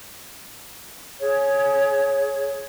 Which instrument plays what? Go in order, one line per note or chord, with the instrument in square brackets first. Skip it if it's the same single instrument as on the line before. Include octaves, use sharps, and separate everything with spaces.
[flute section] G#4 C#5